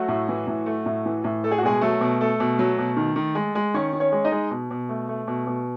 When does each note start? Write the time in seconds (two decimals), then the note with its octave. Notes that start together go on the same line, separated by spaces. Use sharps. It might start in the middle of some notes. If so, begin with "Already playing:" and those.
Already playing: F#3 A3 F#4
0.08 A2
0.29 E3
0.47 A2
0.66 A3
0.86 A2
1.06 E3
1.24 A2
1.44 A3 A4
1.51 G#4
1.58 F#4
1.63 B2 G#3 G#4
1.81 F#3 A3 A4
2.01 B2
2.21 A3 A4
2.40 B2
2.59 F#3
2.78 B2
2.97 D#3
3.16 D#3
3.35 G#3
3.55 G#3
3.74 D#3 C#4 C#5
3.93 D#3
4.00 C#4 C#5
4.12 G#3
4.25 D#4 D#5
4.32 G#3
4.51 B2
4.70 B2
4.89 A3
5.08 A3
5.27 B2
5.47 B2